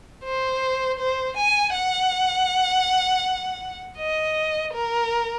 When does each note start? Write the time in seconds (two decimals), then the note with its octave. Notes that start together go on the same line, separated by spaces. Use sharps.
0.24 C5
0.99 C5
1.37 G#5
1.74 F#5
3.98 D#5
4.74 A#4